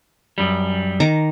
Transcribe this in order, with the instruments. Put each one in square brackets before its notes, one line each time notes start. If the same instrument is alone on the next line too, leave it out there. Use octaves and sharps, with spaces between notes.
[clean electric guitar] F#2 G3
[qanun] D#3 A#5 D6